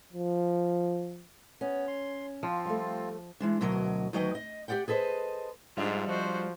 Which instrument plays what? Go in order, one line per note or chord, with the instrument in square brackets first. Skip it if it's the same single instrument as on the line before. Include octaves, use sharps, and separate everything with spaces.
[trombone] F3
[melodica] B3 [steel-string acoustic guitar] C#4
[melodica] C6
[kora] F3 [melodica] C4 F4
[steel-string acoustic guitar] G3 A3
E3 G#3 D4
D2 B2 F#3 A#4 D#5
D2 D#3 F#3 B4 D#5 G5
D#5
G4 A4 D5 F#5 G5
G#4 A4 B4 C5 D#5
[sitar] F2 D4 E5 [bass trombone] G#2 [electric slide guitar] G3 [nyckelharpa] G#3 F4
[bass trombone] F3 [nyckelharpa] F#4 C5